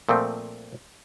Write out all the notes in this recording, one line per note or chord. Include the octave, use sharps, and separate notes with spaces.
A#2 F3 A3 C4